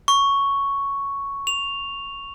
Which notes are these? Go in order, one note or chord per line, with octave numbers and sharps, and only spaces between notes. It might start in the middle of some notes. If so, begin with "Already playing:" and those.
C#6
F7